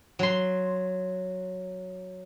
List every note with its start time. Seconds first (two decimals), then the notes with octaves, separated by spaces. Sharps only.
0.19 F#3 C6